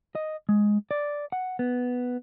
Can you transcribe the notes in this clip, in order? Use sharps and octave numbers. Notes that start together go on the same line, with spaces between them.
D#5
G#3
D5
F#5
B3